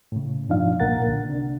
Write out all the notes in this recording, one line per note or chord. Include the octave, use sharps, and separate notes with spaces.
A2 C#3
G2 B2 F3 D4 D#4 F5
C2 A#2 A#3 A#4 F#5 A6
D3
C3 D4